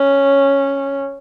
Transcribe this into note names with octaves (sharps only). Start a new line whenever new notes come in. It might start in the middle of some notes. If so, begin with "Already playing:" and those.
Already playing: C#4